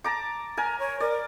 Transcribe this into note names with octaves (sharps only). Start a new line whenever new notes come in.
A5 A#5 D6
A#4 G#5 A#5
C#5
A#4 D5